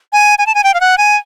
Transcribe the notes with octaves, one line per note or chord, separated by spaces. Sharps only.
G#5
G#5
A5
G#5
G5
F5
F#5
G#5